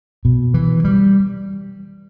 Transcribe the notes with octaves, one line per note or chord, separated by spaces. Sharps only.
B2
E3
G3